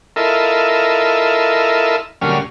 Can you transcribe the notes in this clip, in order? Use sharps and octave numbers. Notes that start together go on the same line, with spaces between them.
E4 F4 A4 A#4 D#5 E5
D2 A#2 F#3 G3 C#4 F6